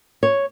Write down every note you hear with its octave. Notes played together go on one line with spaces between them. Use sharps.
C#5